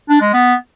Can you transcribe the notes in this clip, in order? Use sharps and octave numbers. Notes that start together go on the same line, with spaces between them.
D4
G#3
B3